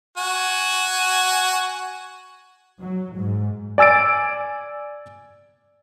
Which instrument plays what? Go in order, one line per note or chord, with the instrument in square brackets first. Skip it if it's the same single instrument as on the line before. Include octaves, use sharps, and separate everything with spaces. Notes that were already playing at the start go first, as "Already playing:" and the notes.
[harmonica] F#4 G#5
[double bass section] F#3
G#2
[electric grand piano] D5 G#5 E6 A6 D7